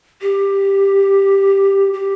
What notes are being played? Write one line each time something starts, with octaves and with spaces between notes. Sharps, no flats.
G4
G4